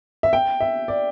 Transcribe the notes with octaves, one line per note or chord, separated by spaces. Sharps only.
E5
G5
E5
D5